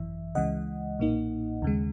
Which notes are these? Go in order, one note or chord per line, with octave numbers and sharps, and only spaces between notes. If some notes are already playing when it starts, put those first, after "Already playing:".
Already playing: G#1 F#2 E3 E5
C#2 C#3 E3 G#3 D#5 F#5
B1 A#2 A#3 D#4
D#2 C#3 G#3